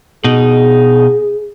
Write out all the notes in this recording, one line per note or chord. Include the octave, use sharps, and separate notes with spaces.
B2 D#4 G#4